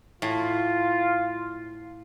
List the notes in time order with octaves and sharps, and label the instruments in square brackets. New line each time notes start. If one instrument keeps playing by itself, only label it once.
[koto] A2 [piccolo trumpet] F4